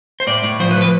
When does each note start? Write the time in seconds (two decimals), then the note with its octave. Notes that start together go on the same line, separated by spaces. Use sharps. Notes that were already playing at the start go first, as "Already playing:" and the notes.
0.20 C5
0.27 A2 D5
0.44 A2
0.60 F3 C5
0.71 B4
0.76 F3
0.82 B4